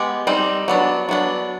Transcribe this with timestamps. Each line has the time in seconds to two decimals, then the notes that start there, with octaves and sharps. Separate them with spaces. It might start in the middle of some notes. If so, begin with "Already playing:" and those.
Already playing: G#3 B3 G4
0.27 G3 C4 D#4
0.68 F#3 B3 D4
1.09 F#3 B3 D4